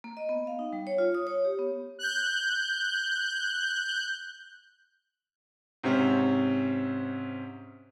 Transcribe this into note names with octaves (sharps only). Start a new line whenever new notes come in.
A#3
D#5
B3
F5
D#4
G3
C#5
F4
D#6
C#5
G4
B3
F#6 G6
G#2 C3 C4 C#4